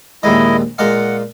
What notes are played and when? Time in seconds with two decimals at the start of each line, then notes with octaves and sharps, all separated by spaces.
0.23 A#1 D#2 G#3 E4 D#5
0.78 A#2 G#3 F5 F#5